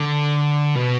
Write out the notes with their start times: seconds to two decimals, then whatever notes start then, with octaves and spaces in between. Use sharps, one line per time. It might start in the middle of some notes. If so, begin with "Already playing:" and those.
Already playing: D3
0.75 B2